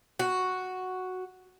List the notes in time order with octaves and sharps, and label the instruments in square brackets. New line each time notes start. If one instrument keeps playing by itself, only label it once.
[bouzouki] F#4